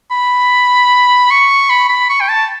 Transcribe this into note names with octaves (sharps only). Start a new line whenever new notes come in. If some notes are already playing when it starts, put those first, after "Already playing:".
B5
C#6
B5
B5
C#6
G5
A5